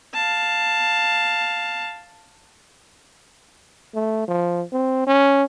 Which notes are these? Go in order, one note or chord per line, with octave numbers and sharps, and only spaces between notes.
F5 A5
A3
F3
C4
C#4